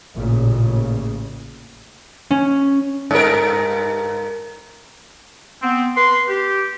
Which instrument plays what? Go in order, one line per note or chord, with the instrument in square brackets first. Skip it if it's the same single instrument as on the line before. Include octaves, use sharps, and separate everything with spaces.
[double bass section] A1 A#2 C#3
[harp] C#4
[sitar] G2 A#4
[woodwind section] B3 C4
B4 C6
G4